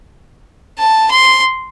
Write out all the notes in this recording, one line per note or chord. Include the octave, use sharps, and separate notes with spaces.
A5
C6